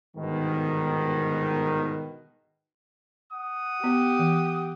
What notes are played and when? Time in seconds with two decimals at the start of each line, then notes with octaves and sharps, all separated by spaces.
0.16 G1 G#2 B2 D#3
3.32 F#5 D#6
3.84 B3 G4
4.19 E3